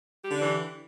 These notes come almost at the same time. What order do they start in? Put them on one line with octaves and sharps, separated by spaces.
G4 D3 D4 E3